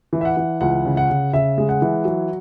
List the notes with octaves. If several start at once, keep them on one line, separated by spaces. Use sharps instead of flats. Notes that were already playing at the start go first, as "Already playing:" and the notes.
E3
E5
F#5
E3
C#2 F#5
C#3
F#5
C#3
C#3 E5
G#3
F#5
E3
F#3